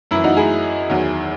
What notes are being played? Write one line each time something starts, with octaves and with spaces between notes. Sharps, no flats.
F#2 E3 E4
D#4 F#4
E4 G#4
E2 D#3 F#3